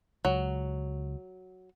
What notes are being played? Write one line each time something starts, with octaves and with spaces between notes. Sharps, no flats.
C#2 F#3